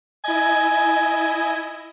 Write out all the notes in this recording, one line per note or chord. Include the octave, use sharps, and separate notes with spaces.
E4 D#5 G#5